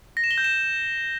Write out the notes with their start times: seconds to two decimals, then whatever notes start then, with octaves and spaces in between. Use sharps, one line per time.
0.17 A#6
0.24 E7
0.31 G7
0.38 G6
0.45 E7